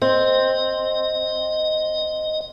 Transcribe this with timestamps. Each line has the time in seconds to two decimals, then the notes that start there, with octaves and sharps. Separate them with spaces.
0.02 C4 D#5